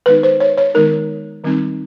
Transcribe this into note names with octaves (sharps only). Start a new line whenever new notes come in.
D#3 G#3 B3 D#4 B4
C5
C#5
C#5
D#3 G#3 B3 D#4 A#4
D#3 G3 C4 D#4